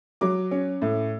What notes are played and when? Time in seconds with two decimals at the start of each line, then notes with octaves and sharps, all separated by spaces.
0.21 F#3 D6
0.51 C#4
0.82 A2